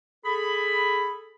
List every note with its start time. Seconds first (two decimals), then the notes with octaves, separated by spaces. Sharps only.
0.25 G#4 A4 B5